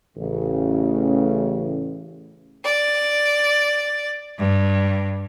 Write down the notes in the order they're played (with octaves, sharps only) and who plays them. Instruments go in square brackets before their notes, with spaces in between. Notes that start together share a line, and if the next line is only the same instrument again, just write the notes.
[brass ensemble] A1 C#3
[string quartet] D5
G2